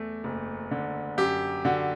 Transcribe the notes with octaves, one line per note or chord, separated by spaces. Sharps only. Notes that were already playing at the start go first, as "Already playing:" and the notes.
Already playing: E2 A3
F#1
D3
F#2 G4
D3 F#4